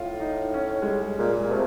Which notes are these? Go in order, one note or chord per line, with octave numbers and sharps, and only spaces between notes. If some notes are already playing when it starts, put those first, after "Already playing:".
Already playing: A2 F4
D#4
C#4
G#3
G3
A#2 G#3
A#3
C3 A3